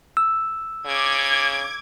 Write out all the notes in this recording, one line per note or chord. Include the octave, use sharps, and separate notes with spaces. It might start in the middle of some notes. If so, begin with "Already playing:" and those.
E6
C#3 D6 G#6